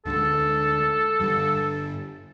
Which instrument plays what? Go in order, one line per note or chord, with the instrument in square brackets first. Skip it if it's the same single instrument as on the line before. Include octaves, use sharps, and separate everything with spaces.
[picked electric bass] D2 D3 G#3 [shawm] A4
[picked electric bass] G2 D3 G3